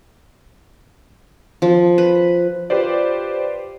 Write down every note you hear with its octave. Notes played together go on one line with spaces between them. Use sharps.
F3
B4
F4 G4 B4 C5 D5